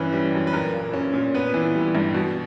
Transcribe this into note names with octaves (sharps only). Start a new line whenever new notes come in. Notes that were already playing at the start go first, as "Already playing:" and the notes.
Already playing: G2 E3 C#4 B4
G3
F#2
B4
A#2 A#4
A#3
C#4
A#2
B3 B4
E3
G3
G2
B2